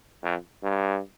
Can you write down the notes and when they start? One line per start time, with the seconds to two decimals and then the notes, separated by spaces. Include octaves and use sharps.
0.23 F2
0.63 G2